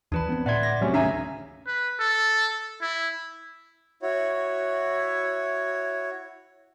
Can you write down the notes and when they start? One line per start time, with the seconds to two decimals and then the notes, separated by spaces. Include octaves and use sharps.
0.12 D#2 E3 D4 B4 B5
0.29 B3 C4
0.46 D2 A2 D5 E5 F#5 C6 G#6
0.63 D6 A#6
0.81 C3 F#3 A3 C#4 F#4
0.93 G#1 D2 C#3 E5 G#5 A#5
1.67 B4
2.00 A4
2.81 E4
4.02 E4 F#4 C#5